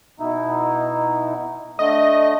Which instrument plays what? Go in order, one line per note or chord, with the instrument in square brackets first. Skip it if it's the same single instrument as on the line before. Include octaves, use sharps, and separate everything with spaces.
[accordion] B2 D#4 E4
[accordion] D3 A3 [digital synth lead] D#5